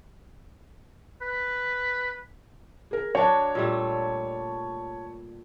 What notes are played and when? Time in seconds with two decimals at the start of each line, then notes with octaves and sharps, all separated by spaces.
1.22 B4
2.91 G#4 A#4
3.15 F#3 D4 C#5 A5
3.55 A#2 G3 A3